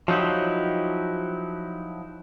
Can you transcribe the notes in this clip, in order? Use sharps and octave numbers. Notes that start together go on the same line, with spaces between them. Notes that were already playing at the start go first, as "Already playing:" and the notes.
F3 F#3 D#4 E4 G4